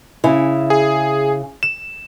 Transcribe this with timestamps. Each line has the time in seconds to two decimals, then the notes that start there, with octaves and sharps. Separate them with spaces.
0.24 C#3 E4
0.70 G#4
1.63 E7